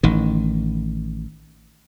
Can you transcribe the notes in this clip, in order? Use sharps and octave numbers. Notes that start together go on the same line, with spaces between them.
A1 D#3